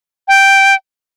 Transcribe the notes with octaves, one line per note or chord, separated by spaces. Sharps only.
G5